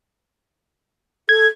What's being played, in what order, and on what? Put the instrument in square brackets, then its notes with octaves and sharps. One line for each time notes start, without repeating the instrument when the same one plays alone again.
[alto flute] A4 [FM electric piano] G#6